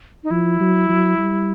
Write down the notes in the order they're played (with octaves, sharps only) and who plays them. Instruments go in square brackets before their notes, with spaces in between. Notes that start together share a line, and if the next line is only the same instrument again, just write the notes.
[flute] D#4
[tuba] F3 [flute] E4
[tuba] F#3
F#3
G3